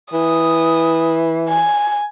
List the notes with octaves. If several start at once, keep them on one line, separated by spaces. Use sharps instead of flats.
E3 D#6
G#5